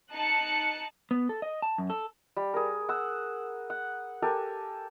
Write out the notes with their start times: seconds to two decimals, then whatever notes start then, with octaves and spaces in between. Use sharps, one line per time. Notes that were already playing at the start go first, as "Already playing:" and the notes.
0.11 D#4 A5 F#6 C#7
1.11 B3
1.29 A4
1.42 D#5
1.62 A5
1.78 F#2
1.90 A4
2.37 G3
2.54 G#4 A#4
2.89 F#5 E6
3.70 F#5
4.22 G4 A4 A#4 G#5